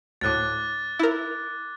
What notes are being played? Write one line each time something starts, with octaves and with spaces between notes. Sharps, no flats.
D2 A2 D6 F#6 A6
E4 A#4